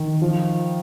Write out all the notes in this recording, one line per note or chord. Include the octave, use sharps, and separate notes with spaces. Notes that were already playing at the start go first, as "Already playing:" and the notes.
Already playing: D#3
F3